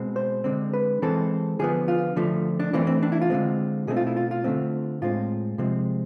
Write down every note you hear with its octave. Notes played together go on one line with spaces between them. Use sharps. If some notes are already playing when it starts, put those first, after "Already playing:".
Already playing: B2 G#3 C4
C5
D3 G#3 C4
B4
E3 G#3 C4 A4
D3 F3 B3 G#4
F4
D3 F3 A3
D4
E3 A3 C4 D4
C4
D4
E4
F4
D3 G#3 C4
B2 A3 C4 G#4
F4
E4
F4
F4
D3 A3 C4
A2 G#3 C4 F4
C3 F3 G#3 C4